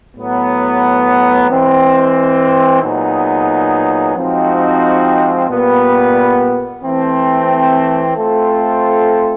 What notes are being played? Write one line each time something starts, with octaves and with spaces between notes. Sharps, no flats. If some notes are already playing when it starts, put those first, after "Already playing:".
A2 F#3 B3
E3 G#3 C4
A#2 F#3 B3 D#4 G#4
F3 G#3 C4 D#4 F#4
A#2 G3 B3
E3 A3 C4
A3 C4 F4 A4 C5